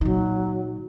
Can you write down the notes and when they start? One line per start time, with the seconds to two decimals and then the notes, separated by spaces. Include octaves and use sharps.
0.01 A#2 D#3 F#3